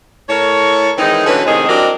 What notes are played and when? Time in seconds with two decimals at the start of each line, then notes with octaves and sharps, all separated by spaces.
0.29 A2 A4 A#4 C#5
0.98 D#3 E3 G#3 C4 D#4
1.26 D3 E3 F#3 C#4 B4
1.46 A2 C3 D#3 G#3 C4 G#4
1.69 F#3 C4 D4 G4 A#4 D#5